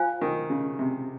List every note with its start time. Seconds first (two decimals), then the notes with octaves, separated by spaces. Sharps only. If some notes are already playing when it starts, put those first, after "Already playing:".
Already playing: F4 C5 F5 G#5
0.21 D#3
0.50 C#3
0.79 C3